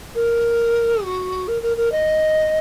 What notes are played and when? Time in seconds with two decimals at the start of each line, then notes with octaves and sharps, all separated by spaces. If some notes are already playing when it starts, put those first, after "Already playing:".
0.15 A#4
1.04 F#4
1.48 A#4
1.62 A#4
1.77 A#4
1.92 D#5